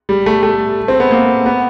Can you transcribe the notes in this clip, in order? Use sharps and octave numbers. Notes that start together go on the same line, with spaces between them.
G3
A3
A3
C4
B3
A#3
B3